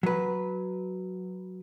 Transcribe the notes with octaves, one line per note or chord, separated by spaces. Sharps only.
F#3 B4